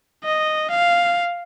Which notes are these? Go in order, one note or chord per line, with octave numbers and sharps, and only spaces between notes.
D#5
F5